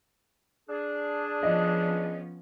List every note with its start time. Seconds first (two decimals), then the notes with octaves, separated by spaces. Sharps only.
0.69 D4 G#4
1.43 F3 B3 C#4 D#5